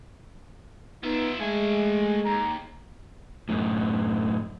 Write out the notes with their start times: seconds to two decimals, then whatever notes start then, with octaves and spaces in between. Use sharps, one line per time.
1.03 B3 D#4 F4 E5
1.41 G#3 A3 E5 G#5
2.25 D#2 A#5
3.49 F#2 A2